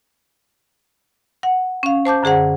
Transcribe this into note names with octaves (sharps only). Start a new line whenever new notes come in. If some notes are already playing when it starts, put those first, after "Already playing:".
F#5
C#4 F5
C5 A5 D6 G6
F#2 D3 G#4 C5 F#5